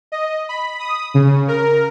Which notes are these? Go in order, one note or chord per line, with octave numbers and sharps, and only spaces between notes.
D#5
B5
D#6
C#3
A#4